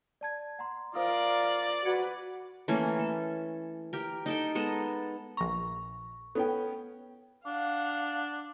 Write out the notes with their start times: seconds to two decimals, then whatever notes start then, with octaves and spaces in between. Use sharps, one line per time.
0.21 D5 A5 G#6
0.59 F#5 A#5 C6
0.95 F4 A#4 C5 D5 F5 D#6
1.85 F#4 B4 D6 G#6 C#7
2.68 E3 A3 A#3 C#4
2.99 A4
3.93 G4 A#4
4.26 D#4 A4 G5
4.55 G#3 B3 A4 A#5
5.37 A#1 A#5 C#6
6.35 B3 C#4 A4 G5
7.46 D4 F5 F#5